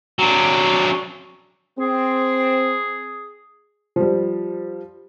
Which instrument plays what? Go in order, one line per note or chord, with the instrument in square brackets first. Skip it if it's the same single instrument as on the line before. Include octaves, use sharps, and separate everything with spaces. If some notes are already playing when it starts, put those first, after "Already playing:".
[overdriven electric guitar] F#3 D4
[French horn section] C4 [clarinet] G#4
[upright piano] F3 G3